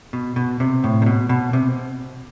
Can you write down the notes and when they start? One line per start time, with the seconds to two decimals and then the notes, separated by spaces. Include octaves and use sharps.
0.13 B2
0.36 B2
0.60 C3
0.84 A2
1.02 C3
1.06 B2
1.29 B2
1.53 C3